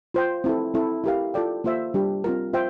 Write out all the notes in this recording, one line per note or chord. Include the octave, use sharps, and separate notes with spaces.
F4 C5 G5
C4 E4 A4
C4 E4 A4
E4 G4 A#4 F5
F4 A4 D5 G5
A#3 F4 C5 E5
G3 D4 G4
C4 F4 A#4
F4 C5 E5 G5